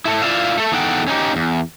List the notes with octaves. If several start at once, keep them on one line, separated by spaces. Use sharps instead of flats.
E4 A4
E4 F4 D5 E5 F5
A3 A4
E2 D#4 A4 F#5 G5
C#4 D#4 G4
E2